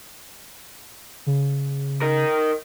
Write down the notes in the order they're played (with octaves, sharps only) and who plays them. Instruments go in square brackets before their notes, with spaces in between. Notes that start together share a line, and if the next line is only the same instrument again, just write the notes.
[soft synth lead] C#3
[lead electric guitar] D#4 A#4